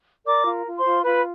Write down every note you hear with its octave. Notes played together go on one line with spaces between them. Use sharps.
A#4 D5 D6
F4
F4
C5 C6
F4
F4 B4 B5